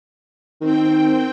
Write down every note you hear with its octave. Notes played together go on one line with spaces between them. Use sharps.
D#3 C4 G5